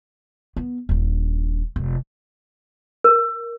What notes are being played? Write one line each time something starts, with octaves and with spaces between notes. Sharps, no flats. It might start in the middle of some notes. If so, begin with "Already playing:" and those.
B3
D#1 D4
F1
A#4